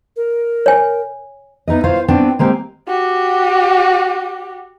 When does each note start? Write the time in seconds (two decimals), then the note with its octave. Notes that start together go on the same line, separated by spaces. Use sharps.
0.16 A#4
0.66 C#5 G#5
1.68 B3 D#4 E4 D#5
1.84 F4 C5 C#5 F5
2.08 B3 C4 D4 F#4
2.39 G#3 A#3 C4 G4
2.88 F#4 G4